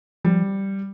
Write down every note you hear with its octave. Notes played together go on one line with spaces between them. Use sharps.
F3 G3